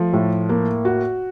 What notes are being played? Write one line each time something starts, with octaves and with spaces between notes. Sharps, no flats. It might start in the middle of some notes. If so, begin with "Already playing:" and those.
Already playing: F3 A3
A2
A#3
F#4